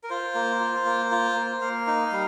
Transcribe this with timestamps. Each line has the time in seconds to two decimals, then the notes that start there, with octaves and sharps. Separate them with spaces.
0.03 A#4
0.10 F4 C5
0.35 A#3
0.60 F4
0.86 A#3
1.11 F4
1.36 A#3
1.61 A#3 F5
1.87 D#4
2.12 G3